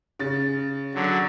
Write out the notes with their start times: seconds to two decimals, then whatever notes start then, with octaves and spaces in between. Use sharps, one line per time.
0.19 C#3 A6
0.94 D3 F#3